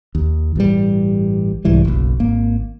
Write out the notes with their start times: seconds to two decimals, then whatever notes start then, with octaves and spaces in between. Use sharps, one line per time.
0.15 D#2
0.56 A1 G2 G3
1.65 C2 G#2 E3 G3
1.85 F#1 B1
2.20 G#1 A#3